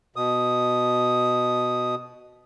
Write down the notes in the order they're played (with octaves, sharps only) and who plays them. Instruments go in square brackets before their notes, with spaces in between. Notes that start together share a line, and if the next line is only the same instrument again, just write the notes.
[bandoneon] B2 D#6